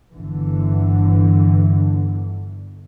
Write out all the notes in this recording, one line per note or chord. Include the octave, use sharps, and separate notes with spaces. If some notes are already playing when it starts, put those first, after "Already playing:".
G1 D3 E3